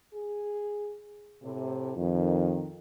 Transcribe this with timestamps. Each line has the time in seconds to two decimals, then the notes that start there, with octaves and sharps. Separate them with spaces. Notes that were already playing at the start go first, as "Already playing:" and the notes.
0.14 G#4
1.42 A2 C3
1.97 F2 D#3